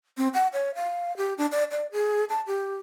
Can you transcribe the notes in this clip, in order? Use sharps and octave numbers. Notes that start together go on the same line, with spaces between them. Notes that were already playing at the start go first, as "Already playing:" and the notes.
C4
F#5
C#5
F5
G4
D4
D5
D5
G#4
A5
G4